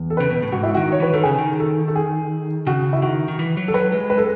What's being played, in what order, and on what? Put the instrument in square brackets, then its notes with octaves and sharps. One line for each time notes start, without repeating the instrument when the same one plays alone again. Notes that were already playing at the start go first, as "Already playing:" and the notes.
Already playing: [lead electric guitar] E2
[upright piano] A4
[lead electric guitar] C#3 [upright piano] B4
[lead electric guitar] B2
A2
[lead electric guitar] G#2 [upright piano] F#4
[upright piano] E4
[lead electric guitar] D#3 [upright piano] F#4
[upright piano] C#5
[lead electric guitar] E3 [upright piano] B4
[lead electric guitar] D#3 [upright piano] A4
[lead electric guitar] C#3 [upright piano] G#4
[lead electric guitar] D#3
[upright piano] A4
A4
G#4
[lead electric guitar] C#3 [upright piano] F#4
[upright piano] E4
[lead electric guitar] D#3 [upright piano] F#4
[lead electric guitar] D#3
E3
F#3
[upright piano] A4
[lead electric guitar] F#3 [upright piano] B4
[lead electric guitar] G#3
[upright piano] B4
A4